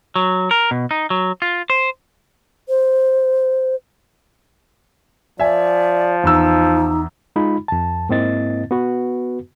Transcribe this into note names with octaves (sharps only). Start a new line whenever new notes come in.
F#3
A#4
B2
D#4
F#3
F4
C5
C5
F3 D5 E5 G#5
E2 D#4 A#5 E6
G#3 D#4 F4 B5
F2 A5
G#2 A#3 C4 E4 D#5 A6
B3 F#4 B4